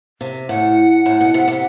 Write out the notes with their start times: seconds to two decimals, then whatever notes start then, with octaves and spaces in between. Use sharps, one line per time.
0.21 C3
0.49 A2 F#5
1.06 A2
1.21 B2
1.34 C3
1.48 C3